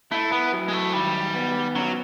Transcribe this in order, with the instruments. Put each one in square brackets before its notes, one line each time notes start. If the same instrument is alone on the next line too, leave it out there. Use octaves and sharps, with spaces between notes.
[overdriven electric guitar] A3 [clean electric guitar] E4
[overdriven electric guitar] B3
[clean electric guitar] F#3
[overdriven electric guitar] G#3
A3
[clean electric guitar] D#3 [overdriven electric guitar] G3
[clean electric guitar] B3
[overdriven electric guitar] F#3 [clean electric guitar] C#4